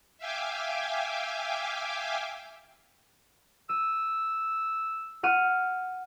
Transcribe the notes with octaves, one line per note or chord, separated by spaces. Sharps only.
E5 F5 G5 G#5 D6
E6 D#7
F#5 F6 D#7